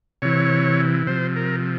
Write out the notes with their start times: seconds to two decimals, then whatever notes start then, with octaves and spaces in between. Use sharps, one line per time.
0.22 C3 E3 C#5
1.07 C3 F3 C5
1.36 A#4